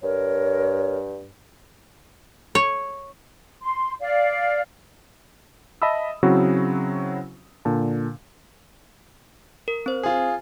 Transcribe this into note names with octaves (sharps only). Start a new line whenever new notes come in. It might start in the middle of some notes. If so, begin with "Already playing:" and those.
G2 A#4 C#5
C#5
C6
D5 F5
D#5 E5 A5 B5 D#6 E6
C#3 F#3 C4 E4 F#4
A#2 D3 A5
A#4
C4 C5
F4 G#4